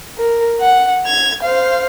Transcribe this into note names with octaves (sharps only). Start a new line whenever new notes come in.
A#4
F#5
G#6 F7
C5 F5